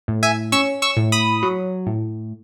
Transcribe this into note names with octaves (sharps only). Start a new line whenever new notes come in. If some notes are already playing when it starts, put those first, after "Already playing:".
A2
E5 G#5
C#4 C#6 E6
C#6 E6
A2
B5 D#6
F#3
A2